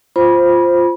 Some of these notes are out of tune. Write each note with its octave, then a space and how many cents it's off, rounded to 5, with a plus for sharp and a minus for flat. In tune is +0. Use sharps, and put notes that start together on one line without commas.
F4 +0 C5 +0 B5 -25